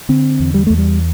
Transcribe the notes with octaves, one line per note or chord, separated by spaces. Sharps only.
D3 C4
E2
G3
E2 A3
G3